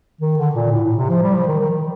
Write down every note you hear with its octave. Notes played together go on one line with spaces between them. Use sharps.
D#3
D3
A#2
A2
A2
C3
F3
G3
F3
D#3
D#3